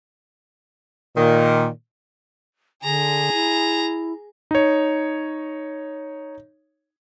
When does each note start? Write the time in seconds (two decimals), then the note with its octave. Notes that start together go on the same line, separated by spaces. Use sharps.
1.16 A#2 D#3
2.83 D3 G#4 A#5
3.33 E4
4.51 D#4 C#5